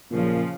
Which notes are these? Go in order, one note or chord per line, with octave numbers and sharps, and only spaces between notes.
A#2 C#3 F3